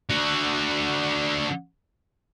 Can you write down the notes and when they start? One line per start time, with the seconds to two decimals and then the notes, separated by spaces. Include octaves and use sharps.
0.10 D3 F#4